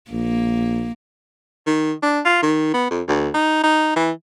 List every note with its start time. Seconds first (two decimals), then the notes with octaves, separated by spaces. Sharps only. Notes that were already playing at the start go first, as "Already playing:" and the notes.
0.11 A#1 A#3
1.66 D#3
2.03 D4
2.25 F4
2.42 D#3
2.74 B3
2.91 F2
3.08 D2
3.34 D#4
3.63 D#4
3.96 E3